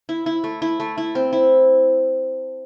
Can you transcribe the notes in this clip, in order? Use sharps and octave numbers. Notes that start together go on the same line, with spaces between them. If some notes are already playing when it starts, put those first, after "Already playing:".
E4
E4
A3
E4
A3
E4
C4
E4